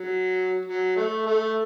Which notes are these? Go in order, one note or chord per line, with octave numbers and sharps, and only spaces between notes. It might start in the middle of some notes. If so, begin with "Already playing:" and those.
Already playing: F#3
F#3
A3
A3